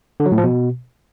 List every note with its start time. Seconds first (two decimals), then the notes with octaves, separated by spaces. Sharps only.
0.20 D3
0.26 F#3
0.32 A2
0.38 F3
0.44 B2